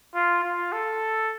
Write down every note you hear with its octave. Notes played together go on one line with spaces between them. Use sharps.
F4
F4
A4